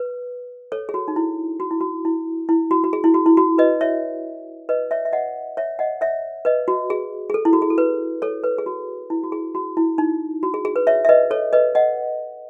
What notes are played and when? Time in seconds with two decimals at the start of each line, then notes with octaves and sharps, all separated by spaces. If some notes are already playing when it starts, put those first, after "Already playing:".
Already playing: B4
0.72 A4 C#5
0.89 G#4
0.94 F#4
1.08 D#4
1.16 E4
1.60 F#4
1.71 E4
1.80 F#4
2.05 E4
2.49 E4
2.71 F#4
2.84 F#4
2.93 G#4
3.04 E4
3.14 F#4
3.26 E4
3.37 F#4
3.58 B4 D#5
3.81 C#5 E5
4.69 B4 D#5
4.91 C#5 E5
5.05 E5
5.13 D#5 F#5
5.57 C#5 E5
5.79 D#5 F#5
6.01 C#5 E5
6.45 B4 D#5
6.68 F#4
6.90 G#4
7.30 G#4
7.34 A4
7.45 E4
7.53 F#4
7.62 G#4
7.70 A4
7.78 B4
8.22 A4 C#5
8.44 B4
8.58 G#4
8.66 F#4
9.10 E4
9.24 F#4
9.32 G#4
9.55 F#4
9.77 E4
9.98 D#4
10.43 F#4
10.54 G#4
10.65 G#4
10.76 B4
10.87 C#5 E5
11.05 E5
11.09 B4 D#5
11.31 A4 C#5
11.53 B4 D#5
11.75 D#5 F#5